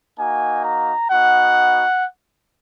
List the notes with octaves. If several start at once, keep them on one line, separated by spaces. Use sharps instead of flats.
A#3 D#4 F#4 G#5
A#5
B3 D#4 F#4 F#5